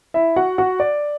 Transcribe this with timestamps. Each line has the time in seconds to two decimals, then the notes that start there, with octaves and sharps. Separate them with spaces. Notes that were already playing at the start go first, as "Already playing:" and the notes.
0.14 E4 E5
0.36 F#4 F#5
0.58 F#4 F#5
0.80 D5